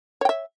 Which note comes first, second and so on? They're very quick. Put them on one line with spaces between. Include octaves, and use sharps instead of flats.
C#5 G5 E5